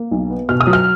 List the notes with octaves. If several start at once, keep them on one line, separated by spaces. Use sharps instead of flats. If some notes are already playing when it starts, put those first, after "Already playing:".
Already playing: A#3
B1
B3
B2 F6
D#6
F#3
F6